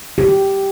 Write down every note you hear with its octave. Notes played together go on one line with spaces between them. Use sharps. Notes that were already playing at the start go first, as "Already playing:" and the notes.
G4